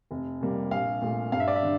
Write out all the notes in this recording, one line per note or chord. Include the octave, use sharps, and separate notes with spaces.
F1
F2 C3 G3 A#3
A#1 F5
A#2 A3
G2 F5
E5
D5
E5
D3